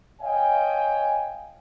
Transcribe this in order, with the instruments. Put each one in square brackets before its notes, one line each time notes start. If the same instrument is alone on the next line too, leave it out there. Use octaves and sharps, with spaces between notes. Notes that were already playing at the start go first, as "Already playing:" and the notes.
[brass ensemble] C#5 D#5 F5 G5 G#5